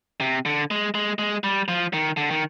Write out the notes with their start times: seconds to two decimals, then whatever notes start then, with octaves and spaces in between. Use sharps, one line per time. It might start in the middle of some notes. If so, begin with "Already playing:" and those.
0.20 C3
0.46 D3
0.71 G#3
0.95 G#3
1.19 G#3
1.44 G3
1.68 F3
1.93 D#3
2.17 D3
2.31 D#3